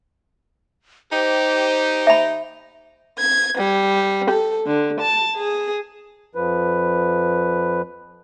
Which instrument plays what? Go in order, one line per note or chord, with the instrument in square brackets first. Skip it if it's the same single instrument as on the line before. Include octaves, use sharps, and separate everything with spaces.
[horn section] D#4 G4 [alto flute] C5
[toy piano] E5 B5
[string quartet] G#6
G3
A4
D3
A5
G#4
[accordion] F2 F3 B4